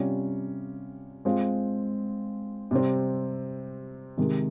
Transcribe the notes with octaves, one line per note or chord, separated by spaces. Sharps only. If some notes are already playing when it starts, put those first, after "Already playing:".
Already playing: C3 G3 C#4 F4
G#3 C4 F4
C3 G3 C4
C3 D#3 G#3